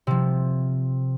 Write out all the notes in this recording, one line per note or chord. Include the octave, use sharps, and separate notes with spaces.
C3 F3